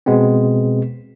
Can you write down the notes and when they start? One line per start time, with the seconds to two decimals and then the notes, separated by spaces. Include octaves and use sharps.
0.06 B2 G#3 B3 C4